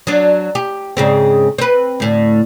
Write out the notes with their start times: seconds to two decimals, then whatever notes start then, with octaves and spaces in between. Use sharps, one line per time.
0.07 F#3 D4
0.55 G4
0.97 G#2 C#3 C4
1.58 C4 B4
2.00 D2 A2